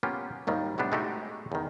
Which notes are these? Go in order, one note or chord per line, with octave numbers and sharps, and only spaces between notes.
A#3 B3 C#4 F4 G4
G#1 D#2 D#3 G3
A2 C3 G3 B3 D4
G#3 A3 D#4 F#4 G4 A4
E2 D#3